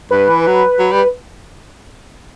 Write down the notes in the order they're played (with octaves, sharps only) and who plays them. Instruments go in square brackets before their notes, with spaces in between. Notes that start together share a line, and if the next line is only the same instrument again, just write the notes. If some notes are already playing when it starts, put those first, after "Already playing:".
[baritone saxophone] G2 [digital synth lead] B4
[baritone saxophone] E3
F#3
F#3
G3